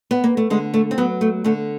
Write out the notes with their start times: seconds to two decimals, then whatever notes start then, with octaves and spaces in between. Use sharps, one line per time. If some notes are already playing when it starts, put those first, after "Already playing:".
0.11 B3
0.24 A#3
0.37 A3
0.50 D3 G#3
0.74 A3
0.91 C4
0.98 F#3 B3
1.21 A3
1.44 D3 A3